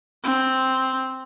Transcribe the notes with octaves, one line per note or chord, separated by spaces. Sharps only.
C4